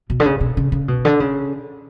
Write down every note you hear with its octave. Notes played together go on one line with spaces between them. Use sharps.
B2
D3
C#3
B2
C#3
C#3
B2
D3
C#3